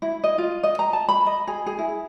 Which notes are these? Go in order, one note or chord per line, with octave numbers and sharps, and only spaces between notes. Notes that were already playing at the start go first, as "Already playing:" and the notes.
E4
D#5
F4
D#5
A#5
A5
B5
D#5
G#4
G#4
E4